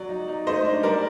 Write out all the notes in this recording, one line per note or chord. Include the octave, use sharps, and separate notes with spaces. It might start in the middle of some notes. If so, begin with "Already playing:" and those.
Already playing: F#3 D5
D#4
D#4
A3 C5 D#5
D4
G3 A#4 D5